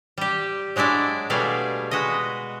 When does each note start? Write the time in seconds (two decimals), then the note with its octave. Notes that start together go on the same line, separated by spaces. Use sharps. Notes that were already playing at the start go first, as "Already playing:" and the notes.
0.18 G3 G4
0.76 F#3 G#3 D4 E4 D5
1.30 B2 G3 A3 G#4 D5 F5
1.91 G#3 F#4 B4 D#5